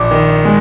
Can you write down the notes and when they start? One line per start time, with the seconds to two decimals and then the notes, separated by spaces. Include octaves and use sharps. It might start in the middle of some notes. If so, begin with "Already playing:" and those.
Already playing: A#1 D6
0.11 D#3
0.45 G#3